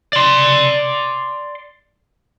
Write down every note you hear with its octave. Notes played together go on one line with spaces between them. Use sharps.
D5 C6